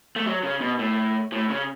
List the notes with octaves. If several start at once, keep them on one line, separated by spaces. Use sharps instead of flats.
A3
F#3
C#3
B2
A2
A2
C#3